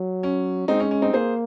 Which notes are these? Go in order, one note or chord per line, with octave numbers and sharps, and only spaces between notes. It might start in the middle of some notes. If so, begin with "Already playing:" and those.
Already playing: F#3
C#4
G#3 C4 D#4
C#4
C#4
C4 D#4
A#3 G#4 C5